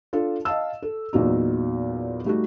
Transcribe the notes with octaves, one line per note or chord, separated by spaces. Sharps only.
D4 F4 A4
D#5 F5 A5 E6
A4
E2 A#2 F#3 D#4
G3 A3 D#4 F#4